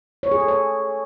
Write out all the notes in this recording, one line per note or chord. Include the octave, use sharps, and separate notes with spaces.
C#5
G#4
A4
C#5